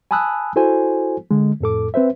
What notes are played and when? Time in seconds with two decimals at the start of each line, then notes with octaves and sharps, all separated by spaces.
0.11 G#5 A5 B5 D#6 E6 F#6
0.56 E4 F#4 A4 C5 G#5
1.31 D3 G#3
1.61 F2 A2 A4 D6
1.94 C4 B4 C5 E5